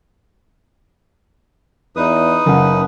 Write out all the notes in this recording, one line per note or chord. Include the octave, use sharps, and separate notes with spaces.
E2 D#4 B4 D#6
F#1 C#3 F#5